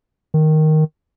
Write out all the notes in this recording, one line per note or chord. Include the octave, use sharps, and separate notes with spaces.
D#3